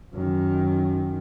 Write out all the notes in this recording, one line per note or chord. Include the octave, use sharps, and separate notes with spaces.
F#2 D#3